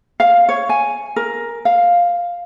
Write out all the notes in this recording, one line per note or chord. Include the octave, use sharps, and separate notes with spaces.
F5
C#5
G#5
A#4
F5